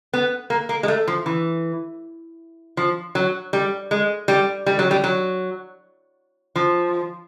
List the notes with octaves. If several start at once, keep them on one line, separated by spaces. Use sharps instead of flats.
B3
A#3
A#3
G#3
A3
F3
E3
F3
F#3
G3
G#3
G3
G3
F#3
G3
F#3
F3